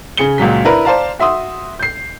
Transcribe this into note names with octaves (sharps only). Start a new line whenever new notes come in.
C#3 G#4 C#7 G7
C#2 A#2 F#3 B6
D4 E4 A#4 B4 A#5
C5 D5 F5 A5 A#5
F#4 E5 C6 D#6
G6 C7